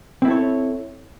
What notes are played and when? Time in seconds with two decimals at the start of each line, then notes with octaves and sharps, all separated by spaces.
0.22 C4
0.25 E4
0.28 A4
0.31 C#5